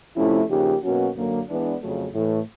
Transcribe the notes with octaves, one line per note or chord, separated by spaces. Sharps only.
C3 F3 A3 C#4 E4
C#3 F3 A#3 D#4 G4
B2 F#3 A#3 C#4 F#4
F#2 D3 F#3 A#3
E3 G#3 B3 D4
F2 C#3 F#3 A3
A2 E3 A3